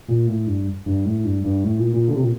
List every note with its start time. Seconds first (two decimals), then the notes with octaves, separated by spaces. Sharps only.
0.08 A#2
0.27 A2
0.47 G2
0.86 G2
1.05 A2
1.24 G2
1.44 G2
1.64 A2
1.79 A#2
1.94 A#2
2.08 D3
2.15 C3
2.23 A#2